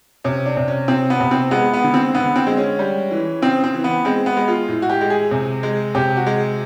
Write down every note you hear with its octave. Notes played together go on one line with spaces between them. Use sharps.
C3 C#4
D4
C3
C#4
C3 C4
B3
C3
C4
G#3 B3
B3
D3
C4
D3 B3
C4
G#3
C#4
G3
E3
C#3 C4
C4
E3
B3
G#3 C4
B3
G#3
F4
A2
F#4
G4
G#3
G#4
C3
G#3
C3 G4
F#4
G#3